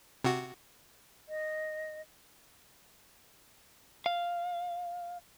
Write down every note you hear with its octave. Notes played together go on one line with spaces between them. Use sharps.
C3 F#4
D#5
F5